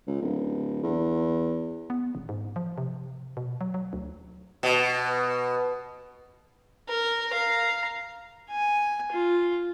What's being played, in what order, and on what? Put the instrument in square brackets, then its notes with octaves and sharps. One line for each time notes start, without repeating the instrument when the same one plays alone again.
[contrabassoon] C#2
D1
E2
[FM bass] B3
D#1
G#2
F3
C3
B2
F#3
F#3
D2
[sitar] B2
[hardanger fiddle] A#4
F5 A#5
[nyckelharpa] G#5
F4